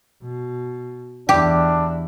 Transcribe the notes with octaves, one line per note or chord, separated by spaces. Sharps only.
B2
E2 D4 E4 G4